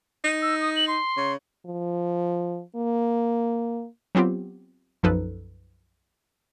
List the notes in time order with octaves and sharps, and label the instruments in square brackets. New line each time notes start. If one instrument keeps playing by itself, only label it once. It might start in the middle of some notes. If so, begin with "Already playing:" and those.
[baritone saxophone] D#4
[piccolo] E6
D#6
F#7
C6
[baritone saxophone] C#3
[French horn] F3
A#3
[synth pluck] F#3 B3 C4 F4 G4
B1 F#2 F3 D#4 A4 B4